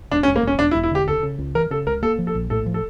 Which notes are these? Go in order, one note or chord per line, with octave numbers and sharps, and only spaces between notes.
E1 D4
C#4
E1
A#3
E1 C#4
E1 D4
E4
E1
E4
D3 G4
C#2 A4
C#3
C#2
E3 A#4
C#3 A4
C#2 A#4
A#3 A4
F3
A4
A#1
A2 A4
F3
A4